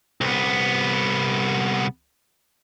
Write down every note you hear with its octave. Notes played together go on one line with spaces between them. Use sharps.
C2 B3